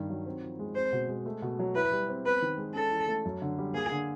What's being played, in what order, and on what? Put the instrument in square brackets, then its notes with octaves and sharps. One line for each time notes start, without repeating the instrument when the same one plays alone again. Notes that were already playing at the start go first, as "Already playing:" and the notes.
Already playing: [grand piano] G2 D#3
F#3
C4
F3
G#3
[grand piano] C4 [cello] C5
[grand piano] B2
G#3
A3
B2
F#3
[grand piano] E4 [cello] B4
[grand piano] G3
C4
[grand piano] B3 [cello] B4
[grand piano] D#3
G#3
[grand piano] C#4 [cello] A4
[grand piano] E3
A3
F#2
D3
G3
[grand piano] A#3 [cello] G#4
[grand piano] D3